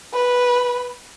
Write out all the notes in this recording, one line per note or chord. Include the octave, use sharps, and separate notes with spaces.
B4